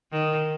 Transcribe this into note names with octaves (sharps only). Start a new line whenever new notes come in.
D#3